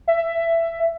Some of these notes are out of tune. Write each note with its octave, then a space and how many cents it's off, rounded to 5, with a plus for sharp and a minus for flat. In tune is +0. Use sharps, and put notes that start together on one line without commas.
E5 +10